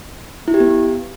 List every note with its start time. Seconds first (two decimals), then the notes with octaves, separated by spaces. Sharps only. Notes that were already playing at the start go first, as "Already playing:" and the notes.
0.48 E4
0.54 G4
0.60 B3